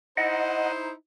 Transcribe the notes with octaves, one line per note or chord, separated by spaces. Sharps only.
D#4 E4 C5 D#5 F#5